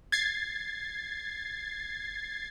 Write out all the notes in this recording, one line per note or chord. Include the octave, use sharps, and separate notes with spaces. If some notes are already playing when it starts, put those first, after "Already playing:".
G#6 A6 C7